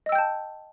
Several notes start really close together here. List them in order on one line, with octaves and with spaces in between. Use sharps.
D#5 E6 G5 G6 A5